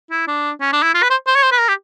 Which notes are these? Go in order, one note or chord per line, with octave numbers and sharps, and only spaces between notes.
E4
D4
C#4
D4
E4
F4
B4
C5
C5
C#5
C5
B4
A#4
G4